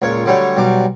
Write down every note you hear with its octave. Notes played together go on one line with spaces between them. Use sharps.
C#2 A#2 C#5
D3 F#3 G3 A3 C#5
B1 F#3 G3 D6